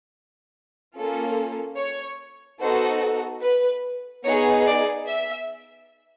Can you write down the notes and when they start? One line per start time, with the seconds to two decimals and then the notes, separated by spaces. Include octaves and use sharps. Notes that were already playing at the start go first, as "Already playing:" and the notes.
0.96 A#3 C#4 F4 A4
1.78 C#5
2.60 B3 D#4 F#4 A4 C5
3.43 B4
4.24 B3 D#4 G#4 C#5
4.66 D5
5.07 E5